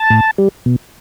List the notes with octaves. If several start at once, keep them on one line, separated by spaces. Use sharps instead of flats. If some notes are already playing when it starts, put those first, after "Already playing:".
Already playing: A5
A2
G3
B2